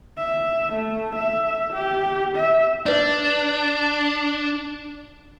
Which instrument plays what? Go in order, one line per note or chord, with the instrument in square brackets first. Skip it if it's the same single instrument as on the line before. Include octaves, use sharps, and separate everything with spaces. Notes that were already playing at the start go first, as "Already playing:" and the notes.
[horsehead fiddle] E5
A3
E5
G4
E5
[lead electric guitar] D4 [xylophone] B4 D5